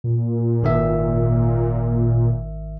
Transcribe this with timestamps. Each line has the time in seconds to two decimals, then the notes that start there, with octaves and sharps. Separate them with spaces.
0.04 A#2
0.63 G#1 D#3 E5